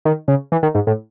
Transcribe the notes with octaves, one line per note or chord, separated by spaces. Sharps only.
D#3
C#3
E3
D#3
G#2
A2